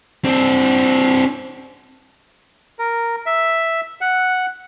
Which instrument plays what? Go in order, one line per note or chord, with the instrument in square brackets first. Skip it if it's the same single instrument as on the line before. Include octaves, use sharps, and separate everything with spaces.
[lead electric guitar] C4 D4
[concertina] A#4
E5
F#5